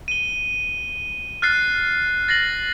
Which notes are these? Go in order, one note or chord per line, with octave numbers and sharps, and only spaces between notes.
D#7 G7
F6 F#6 A6 C7
A6 A#6 C7 F#7